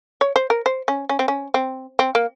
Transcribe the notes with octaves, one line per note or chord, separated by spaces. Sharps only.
C#5
C5
A#4
C5
C#4
C#4
C4
C#4
C4
C4
A#3